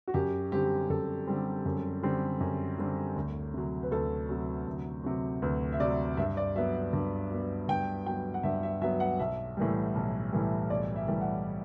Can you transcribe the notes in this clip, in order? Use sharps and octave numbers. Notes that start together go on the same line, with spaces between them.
F#4
F#2 G4
D3 G3 C4 G4
F#2 A4
D3 G3 C4
F#2
D3 G3 C4
F#2
D3 G3 C4
D2
C3 F#3
B4
D2 A4
C3 F#3
D2
C3 F#3
D2 B4
E5
C3 F#3 D5
G2 E5
D5
F#3 B3 E5
G2
F#3 B3
G2 G5
F#3 B3 G5
F#5
G2 E5
E5
F#3 B3 E5
F#5
B1 E5
A2 E3 G3
B1
A2 E3 G3
B1 D5
E5
A2 E3 G3
F#5